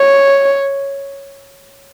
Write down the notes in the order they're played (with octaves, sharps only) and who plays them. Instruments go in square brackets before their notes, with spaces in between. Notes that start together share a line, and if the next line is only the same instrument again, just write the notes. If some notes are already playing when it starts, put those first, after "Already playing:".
Already playing: [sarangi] C#5